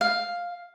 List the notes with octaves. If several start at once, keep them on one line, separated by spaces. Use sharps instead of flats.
F5